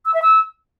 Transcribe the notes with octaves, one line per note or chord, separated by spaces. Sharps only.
E6
E5
E6